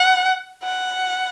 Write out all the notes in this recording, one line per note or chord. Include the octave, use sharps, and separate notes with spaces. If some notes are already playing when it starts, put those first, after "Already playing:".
Already playing: F#5
F#5